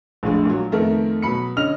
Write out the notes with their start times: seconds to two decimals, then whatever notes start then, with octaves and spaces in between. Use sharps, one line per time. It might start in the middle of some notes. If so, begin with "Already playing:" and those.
0.23 A#1 A2 G#3 D4
0.45 A#2 F#3
0.72 F2 D#3 A3 B3 A#4
1.22 B2 F#3 B5 C#7
1.57 D3 C#4 D#5 F6 F7